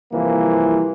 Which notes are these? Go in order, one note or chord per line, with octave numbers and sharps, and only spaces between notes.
C2 E3 F3 A#3